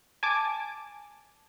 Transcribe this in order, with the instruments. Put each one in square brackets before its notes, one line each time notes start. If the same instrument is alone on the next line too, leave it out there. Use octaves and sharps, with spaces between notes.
[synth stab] G#5 A5 D6